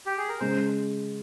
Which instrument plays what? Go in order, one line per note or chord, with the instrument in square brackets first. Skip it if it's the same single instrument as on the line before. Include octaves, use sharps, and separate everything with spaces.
[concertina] G4
G#4
A#4
[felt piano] C#3 G#3 [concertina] C5